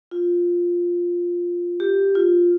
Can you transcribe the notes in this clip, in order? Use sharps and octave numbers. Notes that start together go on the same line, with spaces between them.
F4
G4
F4